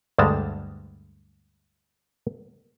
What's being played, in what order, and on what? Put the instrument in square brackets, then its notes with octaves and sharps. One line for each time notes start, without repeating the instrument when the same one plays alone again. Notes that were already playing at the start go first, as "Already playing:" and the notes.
[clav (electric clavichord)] D2 G2 G3 G#3 A5 A#5